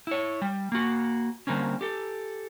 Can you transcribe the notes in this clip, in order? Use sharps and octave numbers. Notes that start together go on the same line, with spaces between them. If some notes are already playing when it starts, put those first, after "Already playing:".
E4 C#5
G3
A#3 F#4
D3 G3 A#3 C4 C#4
G4 A4